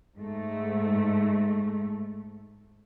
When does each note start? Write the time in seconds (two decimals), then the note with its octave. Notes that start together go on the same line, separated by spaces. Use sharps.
0.19 G#2 A3